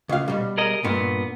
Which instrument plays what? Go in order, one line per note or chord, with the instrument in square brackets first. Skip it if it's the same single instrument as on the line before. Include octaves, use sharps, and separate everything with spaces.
[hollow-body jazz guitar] C#2 F5
B2 G3
[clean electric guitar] G#4 A#4 D#5
[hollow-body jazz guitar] G2 A#2 [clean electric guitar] B3